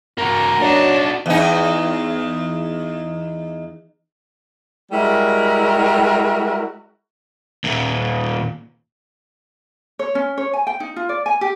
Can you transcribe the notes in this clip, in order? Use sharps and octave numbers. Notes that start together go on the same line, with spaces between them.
A#3 F#4 A#4
F#3 D4 D#4 F#4
E2 D#4
G3 G#3 E4 F#4 A#4
D#2 A#2
C#5
C#4
C#5
G#5
G5
D#4
F4
D5
G#5
G4